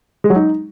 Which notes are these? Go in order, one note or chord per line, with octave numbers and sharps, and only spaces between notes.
G#3
F#3
D#4